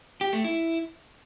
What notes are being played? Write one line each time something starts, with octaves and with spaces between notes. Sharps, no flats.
G4
A3
E4